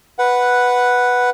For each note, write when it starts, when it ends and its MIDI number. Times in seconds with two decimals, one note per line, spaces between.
0.19 1.30 71
0.19 1.30 78